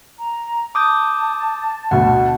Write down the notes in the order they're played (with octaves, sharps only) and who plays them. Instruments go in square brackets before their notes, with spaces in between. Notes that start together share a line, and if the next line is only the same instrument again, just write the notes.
[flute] A#5
[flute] A5 [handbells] D6 D#6 G6
[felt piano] D2 B2 [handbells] F#5